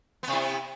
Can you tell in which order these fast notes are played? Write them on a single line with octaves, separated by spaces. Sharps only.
B3 C3 E4